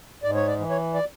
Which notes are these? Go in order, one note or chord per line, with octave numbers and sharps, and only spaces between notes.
G#2 D5
C#5
D5
E3
C#5
D5